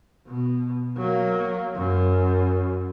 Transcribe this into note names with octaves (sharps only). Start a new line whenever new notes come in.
B2
F#3 A#3
F#2